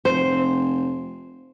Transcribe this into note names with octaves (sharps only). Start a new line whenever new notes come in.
F1 C5